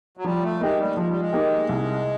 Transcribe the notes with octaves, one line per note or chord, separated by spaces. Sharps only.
F#3
F3 G3
A3
G#3 A#3 D#4 G4
G3
F3 G#3
G3
G#3
A#3 D#4 G4
C2